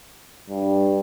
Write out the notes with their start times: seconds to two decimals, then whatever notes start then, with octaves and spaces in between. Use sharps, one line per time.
0.49 G2